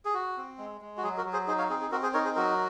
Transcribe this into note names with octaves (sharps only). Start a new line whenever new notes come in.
G#4
F#4
C4
G#3
G#3
F#4
F#3 G#4
F#4 A#4
F#3
G#4 C5
D#4 G#4 C5
C#5 F5
C4 G#4
G#4
C4 F#4 A#4
G#4 C5
D#4 A#4 C#5
G#4 C5
F#3 F#4 A#4